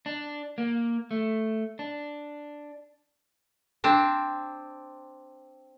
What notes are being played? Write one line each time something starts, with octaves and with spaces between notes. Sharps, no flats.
D4
A#3
A3
D4
C4 D4